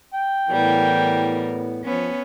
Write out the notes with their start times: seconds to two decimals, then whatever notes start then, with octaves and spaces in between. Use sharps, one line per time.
0.14 G5
0.51 A2 E3 G3 B3 A#4
1.86 F3 B3 C#4